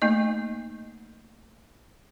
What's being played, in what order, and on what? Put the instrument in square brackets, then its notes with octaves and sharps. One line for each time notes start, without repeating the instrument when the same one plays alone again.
[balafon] A3 A#3 D#4 D#5